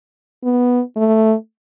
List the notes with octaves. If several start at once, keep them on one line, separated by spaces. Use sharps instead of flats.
B3
A3